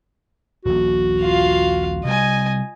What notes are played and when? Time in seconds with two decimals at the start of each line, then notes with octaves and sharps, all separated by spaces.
0.65 D#1 A#1 F#4
1.21 F4 F5
2.05 C3 G3 D#5 G#5